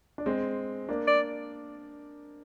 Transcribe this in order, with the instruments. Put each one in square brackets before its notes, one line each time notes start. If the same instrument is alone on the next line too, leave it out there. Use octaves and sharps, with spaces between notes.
[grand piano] D4
G#3 C4
A#3 D4
[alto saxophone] D5